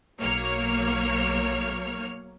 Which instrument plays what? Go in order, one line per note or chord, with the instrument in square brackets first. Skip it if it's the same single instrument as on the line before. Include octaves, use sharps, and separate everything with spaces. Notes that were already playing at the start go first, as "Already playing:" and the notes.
[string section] B1 F#3 A#3 C#5 F6